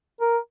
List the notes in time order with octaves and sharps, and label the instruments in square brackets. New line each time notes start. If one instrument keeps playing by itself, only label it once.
[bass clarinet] A#4